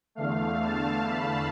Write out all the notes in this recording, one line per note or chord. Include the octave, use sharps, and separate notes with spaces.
E2 D3 A3 F5
A5
B5